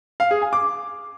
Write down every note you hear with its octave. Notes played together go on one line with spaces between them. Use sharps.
F5
G#4
G#5
D6